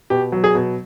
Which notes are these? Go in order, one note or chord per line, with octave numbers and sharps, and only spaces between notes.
B2 G4
F#3
G#4
B2